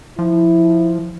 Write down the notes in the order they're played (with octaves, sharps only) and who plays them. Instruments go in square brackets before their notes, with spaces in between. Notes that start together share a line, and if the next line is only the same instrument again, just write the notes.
[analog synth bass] F3 [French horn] E4